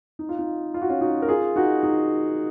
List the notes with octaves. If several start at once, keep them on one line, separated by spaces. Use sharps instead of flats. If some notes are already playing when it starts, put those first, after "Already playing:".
D#4
F4
D#4
F4
F#4
C#4 F4
D#4 F#4
A#4
F4 G#4
D#4 F#4
D#4